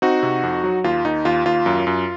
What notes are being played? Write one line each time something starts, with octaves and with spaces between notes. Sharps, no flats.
C4 D#4 F#4
C3
F2
F#3
D#2 F4
D#2 D#4
D#2 F4
D#2 F4
F#2
F#2